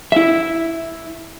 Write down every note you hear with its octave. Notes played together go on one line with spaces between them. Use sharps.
E4 E5